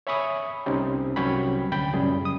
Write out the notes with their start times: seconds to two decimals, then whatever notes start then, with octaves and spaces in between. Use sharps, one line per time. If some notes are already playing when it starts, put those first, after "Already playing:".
0.07 C#5 E5 G#5 B5 C#6 D#6
0.66 C2 C3 C4 C#4 D#4 G4
1.16 C2 F#3 C#4 C#5 G5 B5
1.72 D2 G5 B5
1.94 F#2 A2 C#3 G3 G#4
2.25 D#6